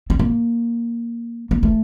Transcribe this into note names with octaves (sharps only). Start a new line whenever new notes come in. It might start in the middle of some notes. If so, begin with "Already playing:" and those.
C4
A#3
A#3
A3